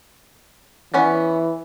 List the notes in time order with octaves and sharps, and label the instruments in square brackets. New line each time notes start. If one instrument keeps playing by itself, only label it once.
[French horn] E3 [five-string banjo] B3 C#4 D5